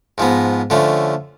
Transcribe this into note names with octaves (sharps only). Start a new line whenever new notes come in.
G#2 F3 G#3 B3
D3 F3 A3 C#4